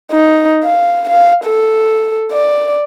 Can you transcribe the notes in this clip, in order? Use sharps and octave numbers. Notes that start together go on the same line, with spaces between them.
D#4
F5
F5
A4
D5